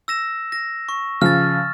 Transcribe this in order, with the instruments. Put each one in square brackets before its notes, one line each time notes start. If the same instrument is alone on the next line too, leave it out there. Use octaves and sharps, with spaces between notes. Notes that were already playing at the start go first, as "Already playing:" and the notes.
[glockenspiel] E6 A#6 E7
A#6
C#6
[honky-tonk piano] C#3 F3 [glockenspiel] F6 A6